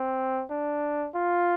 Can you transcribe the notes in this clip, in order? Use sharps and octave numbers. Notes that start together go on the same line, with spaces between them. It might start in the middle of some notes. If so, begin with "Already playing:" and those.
Already playing: C4
D4
F4